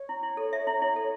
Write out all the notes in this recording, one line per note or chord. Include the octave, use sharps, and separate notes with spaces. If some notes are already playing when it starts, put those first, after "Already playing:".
Already playing: C#5
E4
E4
A4
E5
E4
E4
A4